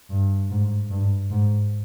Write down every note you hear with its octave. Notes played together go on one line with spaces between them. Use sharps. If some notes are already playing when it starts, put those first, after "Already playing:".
G2
G#2
G2
G#2